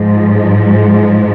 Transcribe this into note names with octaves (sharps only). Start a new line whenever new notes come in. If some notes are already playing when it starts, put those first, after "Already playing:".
Already playing: G#2 F3 G#3